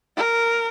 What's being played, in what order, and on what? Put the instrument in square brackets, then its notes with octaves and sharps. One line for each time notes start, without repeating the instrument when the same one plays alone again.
[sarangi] A#4